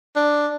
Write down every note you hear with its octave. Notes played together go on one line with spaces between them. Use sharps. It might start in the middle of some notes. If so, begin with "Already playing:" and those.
D4